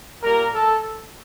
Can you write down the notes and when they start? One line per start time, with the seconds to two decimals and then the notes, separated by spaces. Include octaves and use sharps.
0.22 A#2 G3 A#3 A#4
0.54 A4